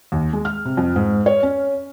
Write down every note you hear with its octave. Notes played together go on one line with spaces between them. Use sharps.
D#2
G#3
F6
C3
F2
G#2
C#5
C#4